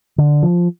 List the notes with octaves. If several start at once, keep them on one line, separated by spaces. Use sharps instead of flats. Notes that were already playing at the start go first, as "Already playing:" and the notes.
D3
F3